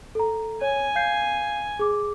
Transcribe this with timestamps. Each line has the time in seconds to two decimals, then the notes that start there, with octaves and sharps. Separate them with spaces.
0.15 A4 A#5
0.61 C#5 G#5
0.95 F5 G6 C7
1.79 G#4 D6